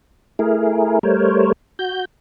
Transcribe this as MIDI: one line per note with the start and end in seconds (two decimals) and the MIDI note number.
0.39 0.99 57
0.39 0.99 64
0.39 0.99 68
0.39 0.99 70
1.03 1.52 55
1.03 1.52 57
1.03 1.52 70
1.03 1.52 72
1.03 1.52 73
1.79 2.05 66
1.79 2.05 91